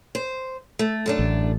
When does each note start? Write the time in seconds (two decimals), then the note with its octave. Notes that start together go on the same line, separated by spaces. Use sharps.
0.15 C5
0.79 A3
1.06 F#2 A3 D4
1.19 A1